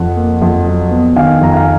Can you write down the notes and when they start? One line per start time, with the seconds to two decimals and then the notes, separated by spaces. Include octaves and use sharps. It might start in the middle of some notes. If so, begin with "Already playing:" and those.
Already playing: F2 F#5
0.16 A#3
0.42 F2
0.66 F#3
0.91 B3
1.16 D#3 F5 G#5
1.41 F2 A#5
1.53 F5 G#5